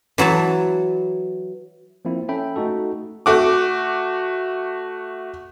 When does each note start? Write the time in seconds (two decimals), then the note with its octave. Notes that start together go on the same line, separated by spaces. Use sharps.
0.18 E3 F#3 C#5 A5
2.05 F3 A#3 C4 E4
2.28 C#4 A4 E5 G5 B5
2.56 A3 D#4 F#4 A4
3.26 A3 F#4 D6